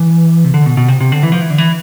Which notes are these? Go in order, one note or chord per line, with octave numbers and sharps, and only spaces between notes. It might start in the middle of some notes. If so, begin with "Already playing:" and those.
Already playing: E3
C3
D3
B2
B2
C3
C3
D3
E3
F3
E3
D3
E3